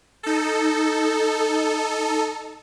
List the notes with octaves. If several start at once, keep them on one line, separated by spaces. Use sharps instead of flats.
D#4 A4